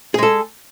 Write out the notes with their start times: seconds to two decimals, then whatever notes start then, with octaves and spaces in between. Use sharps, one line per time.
0.14 G#4
0.18 G#3
0.23 A4